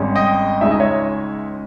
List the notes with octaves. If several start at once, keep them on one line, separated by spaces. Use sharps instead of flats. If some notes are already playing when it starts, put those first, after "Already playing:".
Already playing: G#1 G#2 G3 C#4
D#5 G5
C#2 C#3 G#3 D#4 E5
D#5
C#5 E5